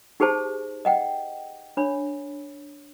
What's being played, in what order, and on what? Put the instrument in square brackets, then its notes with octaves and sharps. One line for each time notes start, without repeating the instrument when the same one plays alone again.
[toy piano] D#4 G4 G#4 C5 A5
D#5 F#5 G5
D4 C#5 B5